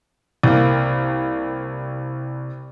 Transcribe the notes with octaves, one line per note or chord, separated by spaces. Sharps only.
C2 A#3